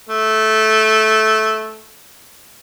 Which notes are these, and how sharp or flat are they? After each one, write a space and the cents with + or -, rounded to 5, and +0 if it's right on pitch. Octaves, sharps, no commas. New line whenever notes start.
A3 -10